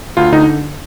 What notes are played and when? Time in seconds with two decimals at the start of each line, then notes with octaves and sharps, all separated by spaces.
0.17 D2 F4
0.32 D3 D#4